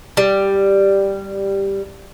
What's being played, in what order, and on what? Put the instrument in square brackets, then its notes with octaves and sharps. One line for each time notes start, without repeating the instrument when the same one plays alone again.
[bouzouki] G3